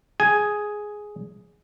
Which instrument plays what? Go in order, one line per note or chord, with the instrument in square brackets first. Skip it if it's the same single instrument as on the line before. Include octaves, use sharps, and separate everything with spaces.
[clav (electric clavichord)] G#4 G#5